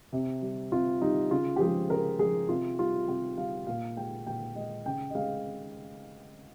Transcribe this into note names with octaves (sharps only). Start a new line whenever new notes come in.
C3
G3
C3 F4
G3 D#4
C#3 F4
G4
F3 G#3 G#4
C#3 A#4
F3 G#3 G#4
C3 F4
G3 F4
C3 G4
G3 F5
A#2 F5
G#3 G5
A#2 G5
G#3 D#5
C#3 G5
D#5
G#3 F5